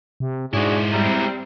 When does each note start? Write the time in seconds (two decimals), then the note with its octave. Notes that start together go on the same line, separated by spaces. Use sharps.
0.20 C3
0.54 G#2 G#3 D4 E4 F#4 G#4
0.92 G3 C4 E5 A#5